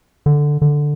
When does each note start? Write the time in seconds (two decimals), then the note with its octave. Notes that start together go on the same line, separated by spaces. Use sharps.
0.26 D3
0.62 D3